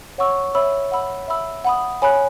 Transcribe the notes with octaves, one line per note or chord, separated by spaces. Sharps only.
C#5 F#5 C#6 E6
C#5 E5 B5 E6
F#5 B5 E6
E5 B5 E6
F#5 B5 D#6
C#5 G#5 B5 F#6